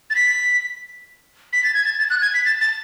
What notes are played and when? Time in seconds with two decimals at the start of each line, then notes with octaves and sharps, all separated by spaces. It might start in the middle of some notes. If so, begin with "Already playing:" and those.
0.10 A6
0.15 B6
1.53 B6
1.64 A6
1.74 G#6
1.85 A6
1.99 A6
2.10 F#6
2.22 G#6
2.34 B6
2.45 A6
2.61 A6